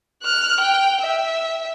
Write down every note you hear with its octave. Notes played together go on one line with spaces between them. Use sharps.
F6 F#6
G5
E5